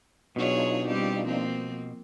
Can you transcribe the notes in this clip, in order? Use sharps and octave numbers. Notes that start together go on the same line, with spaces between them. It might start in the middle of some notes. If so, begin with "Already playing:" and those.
B2 F#3 D4 D#4 F4 G#4 C#5
G3 C4 G4
F3 A#3 C4